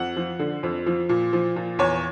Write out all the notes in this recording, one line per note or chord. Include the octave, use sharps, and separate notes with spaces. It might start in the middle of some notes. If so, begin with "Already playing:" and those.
Already playing: F2 F#5
F3
D3
F2
F3
A#2
F3
A#2
E2 C#5